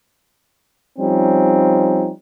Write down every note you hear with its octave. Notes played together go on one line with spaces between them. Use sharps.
F3 G3 C4 C#4 D#4